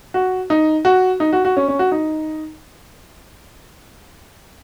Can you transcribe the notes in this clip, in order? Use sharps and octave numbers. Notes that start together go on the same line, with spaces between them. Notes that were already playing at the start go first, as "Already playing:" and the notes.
F#4
D#4
F#4
D#4
F#4
F#4
C#4
C#4
F#4
D#4